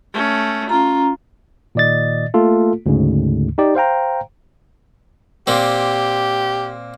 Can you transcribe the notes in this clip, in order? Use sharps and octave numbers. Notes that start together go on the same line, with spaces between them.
A3 C#4
C#4 F4 A#5
A#2 D#3 D5 D#5 A6
A3 A#3 F4 A4
D2 G#2 C#3
D#4 G4 D5
C5 F5 G5 A#5
A#2 C4 G4